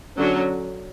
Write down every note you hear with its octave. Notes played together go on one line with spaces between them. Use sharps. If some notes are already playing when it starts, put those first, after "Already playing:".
D3 F#3 C#4